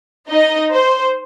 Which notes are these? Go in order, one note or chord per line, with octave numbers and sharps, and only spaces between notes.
D#4 D#5
C5